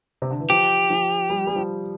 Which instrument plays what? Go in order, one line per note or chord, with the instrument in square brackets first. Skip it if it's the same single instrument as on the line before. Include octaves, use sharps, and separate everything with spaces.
[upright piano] C3
D3
E3
[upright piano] F3 [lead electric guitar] G4
[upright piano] F3
G3
G3
F3